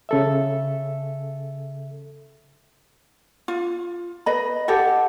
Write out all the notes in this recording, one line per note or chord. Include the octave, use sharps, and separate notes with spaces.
C#3 A4 E5
F4
B4 D#5 B5
G4 A4 D#5 F#5